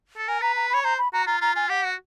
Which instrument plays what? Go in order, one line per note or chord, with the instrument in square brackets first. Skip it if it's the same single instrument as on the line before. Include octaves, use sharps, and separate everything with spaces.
[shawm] A4
[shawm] A#4 [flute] G#5
[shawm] B4 [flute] A#5
[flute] A#5
[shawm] C#5 [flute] B5
[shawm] C5 [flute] A#5
[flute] B5
[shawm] F#4 [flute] A#5
[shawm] F4 [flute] A#5
[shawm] F4 [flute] A#5
[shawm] F4 [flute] G#5
[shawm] G4 [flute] F#5
[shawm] F#4